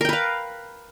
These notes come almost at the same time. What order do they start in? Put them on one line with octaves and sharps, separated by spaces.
A#4 G5 B4 F5